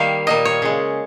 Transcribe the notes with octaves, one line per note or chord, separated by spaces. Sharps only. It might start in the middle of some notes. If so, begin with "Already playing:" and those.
Already playing: D#3 G3 A#3 F5
A#2 G3 A#3 D#5
C#5
C#3 G#3